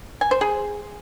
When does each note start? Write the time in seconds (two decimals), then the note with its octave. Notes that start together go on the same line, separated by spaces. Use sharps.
0.21 G#5
0.31 C5
0.41 G#4